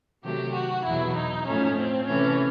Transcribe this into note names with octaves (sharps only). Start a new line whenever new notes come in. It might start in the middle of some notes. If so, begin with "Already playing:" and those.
C3 D#3 F#3 A3 G4
F#4
E2 B2 F#3 E4
D#4
A2 F3 A3 C#4
C4
C3 E3 A3 C#4